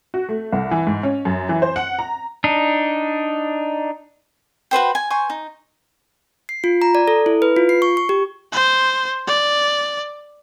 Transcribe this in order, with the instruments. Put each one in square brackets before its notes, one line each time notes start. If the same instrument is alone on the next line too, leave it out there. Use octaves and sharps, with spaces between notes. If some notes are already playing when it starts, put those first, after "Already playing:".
[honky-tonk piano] F#4
A3
C2
E3
G#2
C#4
F#2
E3
C5
F#5
A#5
[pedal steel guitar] D4 D#4
[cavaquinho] F#4 B4 C5 G5
G#5
C5 G#5 C#6
D#4
[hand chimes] C7
F4
A#5
D5
A4
E4
B4
F4
C7
C#6
C#6
G4
[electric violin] C5
D5